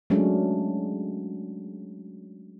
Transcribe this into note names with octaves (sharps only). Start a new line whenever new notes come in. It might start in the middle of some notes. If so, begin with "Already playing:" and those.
F#3 G#3 A3 C#4 D4